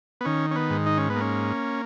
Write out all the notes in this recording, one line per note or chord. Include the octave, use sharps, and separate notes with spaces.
B3
D#3 C#4
C#4
B3
G#2
D#4
C#4
B3
A#3 C#4